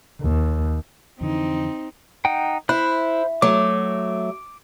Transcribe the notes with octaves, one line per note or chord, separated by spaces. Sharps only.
D#2
F2 D3 E3 C4 D#4
D#4 F#5 G5
E4 C5 B5 F#6
F#3 A3 D6